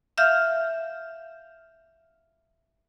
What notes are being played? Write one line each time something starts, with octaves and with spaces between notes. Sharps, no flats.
E5 F5 F6 G6